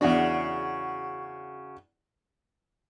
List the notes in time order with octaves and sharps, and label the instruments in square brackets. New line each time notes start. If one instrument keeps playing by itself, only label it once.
[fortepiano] E2 D4 [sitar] C#3 F#4